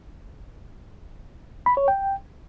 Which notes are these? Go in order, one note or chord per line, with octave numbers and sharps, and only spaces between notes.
B5
C#5
G5